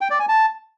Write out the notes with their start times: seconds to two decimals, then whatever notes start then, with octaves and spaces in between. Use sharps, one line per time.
0.01 G5
0.10 D5
0.19 G#5
0.29 A5